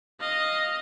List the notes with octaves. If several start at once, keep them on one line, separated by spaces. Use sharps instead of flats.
D#5 F5